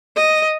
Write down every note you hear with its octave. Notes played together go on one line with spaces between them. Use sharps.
D#5